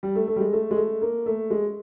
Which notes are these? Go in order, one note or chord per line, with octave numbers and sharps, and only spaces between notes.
G3
A3
A3
G3
G#3
A3
G#3
A3
A#3
A3
G#3